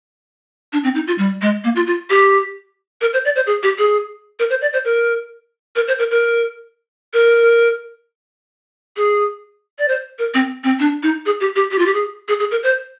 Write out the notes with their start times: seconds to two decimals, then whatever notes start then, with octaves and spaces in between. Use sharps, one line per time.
0.73 D4
0.84 C4
0.95 D#4
1.07 F4
1.18 G3
1.42 G#3
1.64 A#3
1.76 F4
1.87 F4
2.10 G4
3.01 A#4
3.13 C5
3.25 D5
3.36 C5
3.47 G#4
3.63 G4
3.78 G#4
4.39 A#4
4.50 C5
4.62 D5
4.73 C5
4.85 A#4
5.76 A#4
5.88 C5
5.99 A#4
6.11 A#4
7.13 A#4
8.97 G#4
9.79 D5
9.88 C5
10.19 A#4
10.34 C4
10.64 C4
10.80 D4
11.03 D#4
11.26 G#4
11.40 G4
11.56 G4
11.71 G4
11.79 F4
11.86 G4
11.94 G#4
12.28 G#4
12.40 G#4
12.51 A#4
12.63 C5